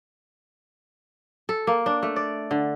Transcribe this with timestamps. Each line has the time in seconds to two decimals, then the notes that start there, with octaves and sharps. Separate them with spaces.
1.49 A4
1.67 A#3
1.86 D4
2.03 A3
2.16 D5
2.51 D3